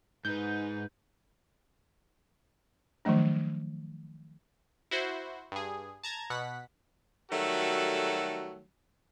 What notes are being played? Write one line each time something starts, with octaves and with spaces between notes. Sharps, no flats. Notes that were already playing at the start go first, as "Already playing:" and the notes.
G#2 D#4 B4 G6
D#3 F3 F#3 A3 D4
E4 F#4 C5
G2 G#4
A5 A#5 G#6
B2 F#5 B6
D#3 F#3 G3 A3 F#4 A4